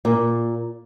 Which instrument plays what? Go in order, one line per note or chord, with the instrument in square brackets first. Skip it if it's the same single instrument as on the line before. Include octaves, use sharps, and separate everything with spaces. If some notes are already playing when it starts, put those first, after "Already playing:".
[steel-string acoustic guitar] A#2